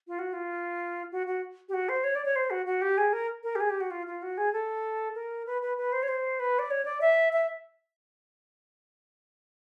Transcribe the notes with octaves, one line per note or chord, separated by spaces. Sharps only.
F4
F#4
F4
F#4
F#4
G4
F#4
C5
C#5
D5
C#5
C5
F#4
F#4
G4
G#4
A#4
A#4
G4
G#4
G4
F#4
F4
F4
F#4
G#4
A4
A#4
B4
B4
B4
C5
C#5
C5
B4
D5
C#5
D5
E5
E5